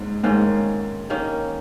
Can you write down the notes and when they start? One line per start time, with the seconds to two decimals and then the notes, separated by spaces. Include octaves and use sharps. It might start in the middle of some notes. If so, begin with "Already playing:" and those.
Already playing: G#2 C#4
0.23 G#2 D#3 A#3 C#4
1.10 D#3 A#3 C#4